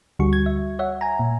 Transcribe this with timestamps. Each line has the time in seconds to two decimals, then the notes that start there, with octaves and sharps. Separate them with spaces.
0.19 D2 D3 G3 F#4 C#6
0.33 G#6
0.46 E5
0.79 C#5 E5 F#5
1.01 G#5 A#5
1.19 A#2